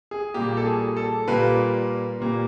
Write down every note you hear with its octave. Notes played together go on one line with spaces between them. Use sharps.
G#4
A#2 G3 A#3 G4
A4
G#4
A4
A#2 G3 A#3 B4
A#2 G3 A#3